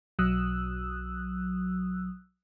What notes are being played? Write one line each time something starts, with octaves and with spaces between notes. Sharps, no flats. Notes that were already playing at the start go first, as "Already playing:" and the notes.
B1 F#3 D#6 E6 F#6